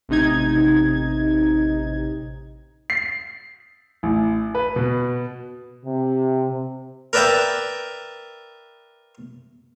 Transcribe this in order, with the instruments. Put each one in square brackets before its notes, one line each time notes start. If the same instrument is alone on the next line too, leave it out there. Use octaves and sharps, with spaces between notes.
[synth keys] A1 C3 D#4 G#6
[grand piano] C7
A1
B4
B2
[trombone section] C3
[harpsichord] A#4 B4 D5 E5 G5